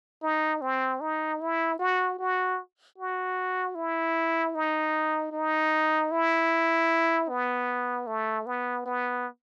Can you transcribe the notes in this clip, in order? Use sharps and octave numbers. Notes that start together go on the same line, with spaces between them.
D#4
C4
D#4
E4
F#4
F#4
F#4
E4
D#4
D#4
E4
B3
A3
B3
B3